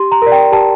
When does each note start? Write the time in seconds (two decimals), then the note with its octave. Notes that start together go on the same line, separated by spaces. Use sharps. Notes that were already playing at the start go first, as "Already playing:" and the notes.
Already playing: G4 C6
0.12 A#5
0.22 A#4 D5
0.32 G5
0.52 G4 A5